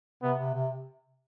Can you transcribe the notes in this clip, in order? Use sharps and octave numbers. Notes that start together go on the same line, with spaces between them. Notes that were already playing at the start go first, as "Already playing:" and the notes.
C3 B3
C3
C3